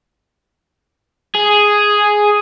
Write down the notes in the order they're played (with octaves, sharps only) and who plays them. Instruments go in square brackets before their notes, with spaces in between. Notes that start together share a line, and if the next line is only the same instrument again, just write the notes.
[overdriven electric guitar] G#4